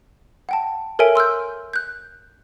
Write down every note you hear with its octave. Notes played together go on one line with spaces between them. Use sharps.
F#5 G5 A5
A4 A#4 C#5 E5 G#5 D7
C6 E6 F6 G6
F#6 G6